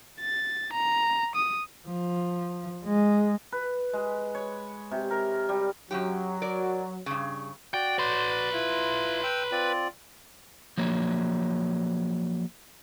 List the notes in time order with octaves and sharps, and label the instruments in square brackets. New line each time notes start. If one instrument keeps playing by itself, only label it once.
[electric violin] A6
A#5
D#6
[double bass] F3
G#3
[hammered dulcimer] B4
G#3
C#5
C3
A#4
G3
[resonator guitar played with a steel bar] F#2 E3 G4 [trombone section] F#3
[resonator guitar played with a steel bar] A#4 D5
G2 C#3
[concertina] F#4 D5 [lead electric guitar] G5
[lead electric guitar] B4 C6
[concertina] E4 F4
G5 E6
C4 F4 D5
[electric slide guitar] F3 F#3 A#3 C#5